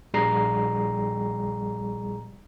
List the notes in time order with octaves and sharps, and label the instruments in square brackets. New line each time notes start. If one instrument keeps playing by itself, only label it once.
[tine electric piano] A#1 G3 G#4 A#5 C7